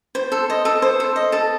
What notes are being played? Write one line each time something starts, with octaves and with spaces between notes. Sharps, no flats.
C5
A4
D#5
A4
C5
A4
D#5
A4